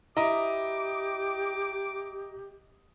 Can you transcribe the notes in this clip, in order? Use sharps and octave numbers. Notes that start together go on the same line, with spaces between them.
E4 G4 D#5 A#5 D6 D#6